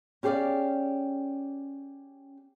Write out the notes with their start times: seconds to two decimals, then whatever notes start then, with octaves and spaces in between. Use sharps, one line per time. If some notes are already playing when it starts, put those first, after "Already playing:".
0.23 C#4 G4 G#4 C5 D5 F5